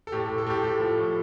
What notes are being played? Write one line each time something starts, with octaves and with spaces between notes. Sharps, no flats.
A4
A2 G4
A4
A2
A4
A2 G4
A2 A4
F3
A2